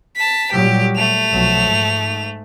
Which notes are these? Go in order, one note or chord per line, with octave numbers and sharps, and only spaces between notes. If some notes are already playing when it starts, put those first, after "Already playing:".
A5 B6
A#2 F#3 G3 G4
A3 F7
B1 F3 F#3
G#2